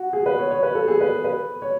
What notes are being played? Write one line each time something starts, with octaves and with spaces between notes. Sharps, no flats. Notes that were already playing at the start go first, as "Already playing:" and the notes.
Already playing: F#4
G#4
B4
C#5
C#5
B4
A4
G#4
B4
B4
C#5